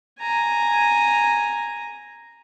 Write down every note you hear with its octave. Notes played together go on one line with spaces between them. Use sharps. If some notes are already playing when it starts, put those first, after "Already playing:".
G#5 A#5